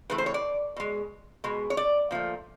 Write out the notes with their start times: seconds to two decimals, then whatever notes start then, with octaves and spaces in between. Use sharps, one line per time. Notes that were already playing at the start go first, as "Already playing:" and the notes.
0.10 A2 E3 A3 B4
0.18 C5
0.26 C#5
0.34 D5
0.76 B2 G#3
1.44 B2 G#3
1.70 C#5
1.77 D5
2.11 A#2 F3 A3